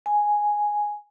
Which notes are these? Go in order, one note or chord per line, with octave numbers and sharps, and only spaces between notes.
G#5